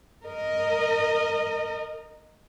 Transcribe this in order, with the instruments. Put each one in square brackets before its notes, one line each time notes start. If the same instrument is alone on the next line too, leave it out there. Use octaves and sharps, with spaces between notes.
[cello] A#4 D#5